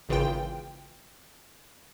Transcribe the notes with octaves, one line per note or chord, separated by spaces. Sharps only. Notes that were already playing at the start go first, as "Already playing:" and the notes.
G#1 C#3 E3 F4 G5